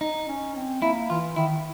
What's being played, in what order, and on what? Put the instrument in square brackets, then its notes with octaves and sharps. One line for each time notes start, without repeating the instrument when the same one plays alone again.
[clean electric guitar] D#4
[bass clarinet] C#4
C4
[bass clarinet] A#3 [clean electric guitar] E4
[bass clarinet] E3 [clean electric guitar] F4
[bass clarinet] D#3 [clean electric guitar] E4